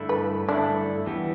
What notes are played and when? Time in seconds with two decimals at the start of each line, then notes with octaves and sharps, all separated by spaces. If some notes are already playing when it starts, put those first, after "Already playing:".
Already playing: G2 D3 A3 E4
0.09 B4
0.48 G2 D3 A3 D4 E4
1.06 E2 E3 G3 B3